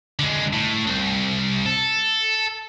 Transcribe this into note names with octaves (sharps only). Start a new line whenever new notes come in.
D3 G#3
A2
C2
A4